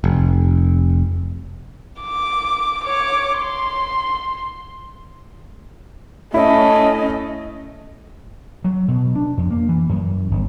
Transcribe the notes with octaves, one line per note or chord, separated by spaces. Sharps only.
F1
D6
C#5 D6
C6
A3 C#4 E4 C#5 D#5 E5
F#3
B2
D4
F2
A#3
E3
F#2
G1